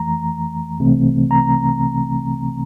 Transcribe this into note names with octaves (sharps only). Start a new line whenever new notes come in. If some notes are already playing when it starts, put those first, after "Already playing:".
Already playing: F2 E3 A3 A#5
C2 C3 E3 A3 C4
A#5